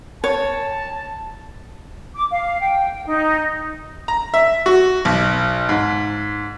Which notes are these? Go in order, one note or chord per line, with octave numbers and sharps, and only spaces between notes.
C#5 A5
D6
F5
G5
D#4
A#5
E5
F#4
B1
G#2